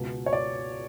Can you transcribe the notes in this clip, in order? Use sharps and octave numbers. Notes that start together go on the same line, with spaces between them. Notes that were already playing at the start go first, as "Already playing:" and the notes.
Already playing: C#2 B2
C#5
D5